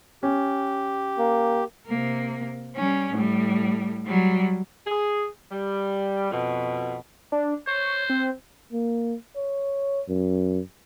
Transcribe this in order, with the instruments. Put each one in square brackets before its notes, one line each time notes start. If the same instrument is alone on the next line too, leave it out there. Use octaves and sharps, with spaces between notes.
[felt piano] C#4 [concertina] G4
[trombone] A#3
[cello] C3 A#3
G3 C#4
A2 G3
F#3 G3
[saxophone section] G#4
G3
F2 B2
[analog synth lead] D4
[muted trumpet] C5 [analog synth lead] C#5
[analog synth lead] C4
[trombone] A#3
C#5
F#2